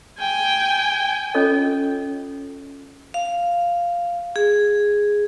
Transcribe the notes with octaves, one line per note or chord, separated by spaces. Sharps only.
G5 G#5
C#4 F4 A4 C#5 D#5
F5
G#4